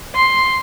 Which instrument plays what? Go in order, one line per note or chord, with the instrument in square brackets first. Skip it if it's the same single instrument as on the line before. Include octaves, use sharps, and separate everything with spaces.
[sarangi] C6